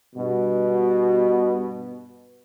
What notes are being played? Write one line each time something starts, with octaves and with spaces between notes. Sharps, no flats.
G2 B2